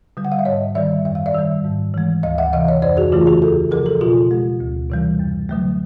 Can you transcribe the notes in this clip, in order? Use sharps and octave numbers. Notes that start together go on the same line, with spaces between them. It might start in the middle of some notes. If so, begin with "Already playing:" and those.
D3 G3
F#5
F5
E5
G#2 C#5 D#5
D#3 G3 D5 E5
F#2 E5
F5
D5 E5
D#3 G3
G#2
E3 G#3
D2 D#5 F5
E5 F#5
C3 E3 D#5 F5
C#5 D#5
F2 C5 D5
F#4 G#4
C#3 E3 A3 F4 G4
F#4 G#4
D#2 G4 A4
C#3 F3 G#4 A#4
G4 A4
B2 F4 G4
G#3
D2
C3 E3 G3
F#2
D3 F#3 A3